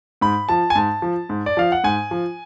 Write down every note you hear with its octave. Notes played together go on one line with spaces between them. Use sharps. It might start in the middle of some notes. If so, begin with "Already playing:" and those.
G#2 B5
F3 A5
G#5
G#2 A5
F3
G#2
D5
F3 F5
F#5
G#2 G#5
F3